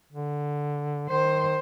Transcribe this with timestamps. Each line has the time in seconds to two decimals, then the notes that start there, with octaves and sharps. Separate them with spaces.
0.13 D3
1.10 D#3 C5